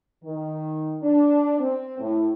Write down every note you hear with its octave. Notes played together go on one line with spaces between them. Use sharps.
D#3
D4
C4
A2